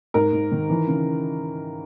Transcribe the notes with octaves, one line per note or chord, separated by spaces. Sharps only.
G#2 A#4
G#2
D#3
E3
C#3